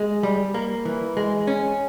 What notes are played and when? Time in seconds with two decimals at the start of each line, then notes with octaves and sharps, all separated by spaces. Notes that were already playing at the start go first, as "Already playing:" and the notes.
Already playing: G#3
0.23 G3
0.54 A#3
0.85 E3
1.17 G#3
1.47 C#4